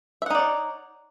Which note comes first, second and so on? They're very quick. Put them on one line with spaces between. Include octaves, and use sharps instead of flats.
E5 F#5 D#4 D5 C#5